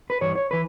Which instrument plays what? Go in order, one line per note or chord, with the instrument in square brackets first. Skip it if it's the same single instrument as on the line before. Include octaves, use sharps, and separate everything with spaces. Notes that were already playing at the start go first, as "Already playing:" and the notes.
[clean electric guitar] B4
G2 E3 G3 C#5
C#5
E3 B4